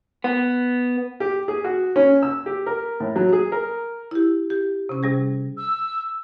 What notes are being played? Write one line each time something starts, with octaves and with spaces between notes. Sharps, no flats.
B3
G4
G#4
F#4
C#4
E6
G4
A#4
A2
F#3
G#4
A#4
E4 G4
G4
C3 C#4
C3 G3 G#4
E6